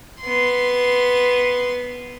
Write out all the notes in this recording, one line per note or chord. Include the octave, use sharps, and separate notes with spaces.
B3 C6